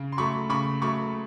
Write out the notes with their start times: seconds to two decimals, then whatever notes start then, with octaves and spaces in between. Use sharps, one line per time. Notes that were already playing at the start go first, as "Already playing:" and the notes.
Already playing: C#3
0.12 C6
0.17 F#3 A3 B5 C#6
0.49 C#3 B5 C#6
0.82 F#3 A3 B5 C#6